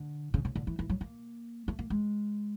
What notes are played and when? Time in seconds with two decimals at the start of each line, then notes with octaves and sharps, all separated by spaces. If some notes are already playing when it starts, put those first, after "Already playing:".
Already playing: D3
0.34 C#3
0.45 C#3
0.56 D3
0.67 E3
0.79 E3
0.89 F#3
1.01 A#3
1.68 A3
1.79 A#3
1.90 G#3